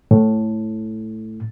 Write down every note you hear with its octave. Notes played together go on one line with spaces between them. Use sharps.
A2